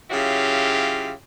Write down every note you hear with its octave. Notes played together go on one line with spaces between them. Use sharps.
C#3 F#3 E4 F4 G4